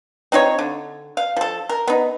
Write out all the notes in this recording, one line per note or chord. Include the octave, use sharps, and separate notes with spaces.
C4 D#4 F4 C#5
D3
F5
F3 A4
A#4
B3 D#4